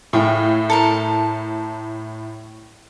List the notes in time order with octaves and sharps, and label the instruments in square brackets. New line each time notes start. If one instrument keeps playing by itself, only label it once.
[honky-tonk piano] A2 [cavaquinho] G#4 F5 G5
[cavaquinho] A4 A#4 A5